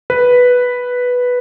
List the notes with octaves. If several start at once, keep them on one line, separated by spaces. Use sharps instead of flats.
B4